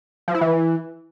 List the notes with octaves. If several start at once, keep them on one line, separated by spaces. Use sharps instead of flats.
F3
E4
E3